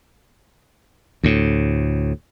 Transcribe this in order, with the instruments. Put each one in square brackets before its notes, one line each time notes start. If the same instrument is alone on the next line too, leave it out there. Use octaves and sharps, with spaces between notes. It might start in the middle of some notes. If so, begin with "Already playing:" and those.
[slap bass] D2 A2